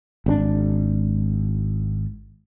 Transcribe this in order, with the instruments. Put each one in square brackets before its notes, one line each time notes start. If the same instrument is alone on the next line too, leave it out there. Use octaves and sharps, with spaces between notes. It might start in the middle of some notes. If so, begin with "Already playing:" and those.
[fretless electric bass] G#1 C#3 D4